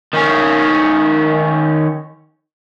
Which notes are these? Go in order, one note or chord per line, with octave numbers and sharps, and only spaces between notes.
D#3 C#4